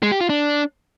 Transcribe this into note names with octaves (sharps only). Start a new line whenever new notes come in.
G#3
G4
F4
D4